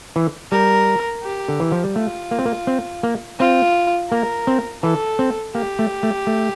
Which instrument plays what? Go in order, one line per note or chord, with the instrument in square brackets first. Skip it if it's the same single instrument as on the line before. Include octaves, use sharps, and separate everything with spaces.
[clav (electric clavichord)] E3
[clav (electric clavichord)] G3 [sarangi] A#4
[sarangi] G4
[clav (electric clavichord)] D3
E3
F3
G3
[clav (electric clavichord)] A3 [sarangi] F4
[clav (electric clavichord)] A#3
C4
A#3
C4
A#3
[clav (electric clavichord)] C4 [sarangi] F4
[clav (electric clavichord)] A#3 [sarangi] A#4
[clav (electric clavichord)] C4
[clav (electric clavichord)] E3 [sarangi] A4
[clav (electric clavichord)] C4
[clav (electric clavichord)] A#3 [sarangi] G4
[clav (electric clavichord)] A3
A3
A3